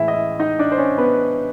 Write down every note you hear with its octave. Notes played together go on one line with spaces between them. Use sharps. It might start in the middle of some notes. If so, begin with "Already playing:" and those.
Already playing: A2 E3 G#3 E4 E5
D#5
E4 E5
D#4 D#5
D4 D5
C5
C#4 C#5
B3 B4